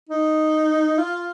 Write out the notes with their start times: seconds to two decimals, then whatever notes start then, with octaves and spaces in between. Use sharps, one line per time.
0.09 D#4
0.98 F4